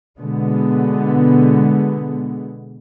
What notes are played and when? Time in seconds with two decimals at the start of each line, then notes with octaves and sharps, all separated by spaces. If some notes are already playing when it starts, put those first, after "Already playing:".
0.19 B2 D3 G#3 B3